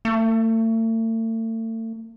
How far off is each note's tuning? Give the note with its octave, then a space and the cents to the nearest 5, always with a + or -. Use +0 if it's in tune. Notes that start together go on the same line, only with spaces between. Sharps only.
A3 +40